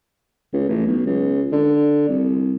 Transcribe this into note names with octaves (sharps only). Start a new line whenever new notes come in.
C#2
A1
B1
C#2
D3
C2